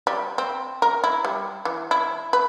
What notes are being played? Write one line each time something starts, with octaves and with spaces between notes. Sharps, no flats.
G3
C4
A#4
E4
G3
E3
E4
B4